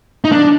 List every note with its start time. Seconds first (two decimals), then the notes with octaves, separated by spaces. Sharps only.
0.25 D#4
0.32 D4